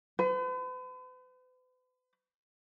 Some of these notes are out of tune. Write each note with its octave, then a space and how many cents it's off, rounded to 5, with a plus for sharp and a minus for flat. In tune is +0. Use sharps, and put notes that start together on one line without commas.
B4 +45